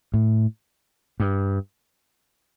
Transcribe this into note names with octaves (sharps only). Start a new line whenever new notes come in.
A2
G2